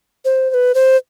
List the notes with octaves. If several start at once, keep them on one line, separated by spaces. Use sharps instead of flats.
C5
C5
B4
C5